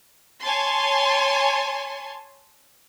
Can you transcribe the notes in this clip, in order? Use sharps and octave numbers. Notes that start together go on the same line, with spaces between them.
C#5 G#5 A5 C6